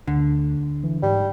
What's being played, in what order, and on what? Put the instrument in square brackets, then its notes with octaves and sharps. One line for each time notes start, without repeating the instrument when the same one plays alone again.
[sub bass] D2 [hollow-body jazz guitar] D3
[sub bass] E3
[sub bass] G#2 [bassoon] G3